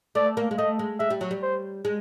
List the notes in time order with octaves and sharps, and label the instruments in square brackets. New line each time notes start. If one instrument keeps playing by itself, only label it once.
[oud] A3 [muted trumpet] D5
[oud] A#3
G#3
[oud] A3 [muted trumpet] D#5
[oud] G#3
[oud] G#3 [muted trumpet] E5
[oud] G3
F#3
G3
[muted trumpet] C5
[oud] G#3